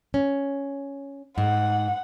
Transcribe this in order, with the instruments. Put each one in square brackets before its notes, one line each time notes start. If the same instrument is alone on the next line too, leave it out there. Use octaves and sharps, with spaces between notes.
[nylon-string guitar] C#4
[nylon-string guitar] G#2 [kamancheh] F#5